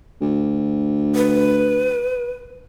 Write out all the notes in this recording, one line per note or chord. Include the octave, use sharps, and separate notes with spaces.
D2
B4